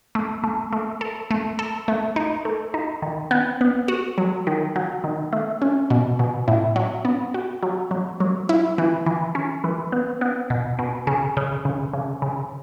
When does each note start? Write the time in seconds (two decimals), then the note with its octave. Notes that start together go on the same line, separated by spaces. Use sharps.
0.15 A3
0.44 A3
0.73 A3
1.01 A4
1.31 A3
1.59 A4
1.88 A3
2.16 D#4
2.45 A3
2.74 D#4
3.02 D#3
3.31 B3
3.61 B3
3.88 F#4
4.18 F#3
4.47 D#3
4.76 F#3
5.04 D#3
5.33 A3
5.62 C#4
5.90 B2
6.19 B2
6.48 A2
6.76 F#3
7.05 B3
7.34 F#4
7.63 F#3
7.91 F#3
8.20 F#3
8.49 E4
8.78 E3
9.06 E3
9.35 C#4
9.64 E3
9.92 B3
10.21 B3
10.50 B2
10.79 B2
11.07 C#3
11.37 C#3
11.65 C#3
11.93 C#3
12.22 C#3